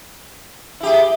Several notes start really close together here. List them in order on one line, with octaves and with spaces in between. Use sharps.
E4 G4 G#4